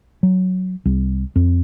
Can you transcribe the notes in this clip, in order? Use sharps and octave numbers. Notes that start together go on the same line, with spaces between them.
F#3
C2
F2